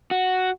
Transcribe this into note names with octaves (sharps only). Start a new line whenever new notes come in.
F#4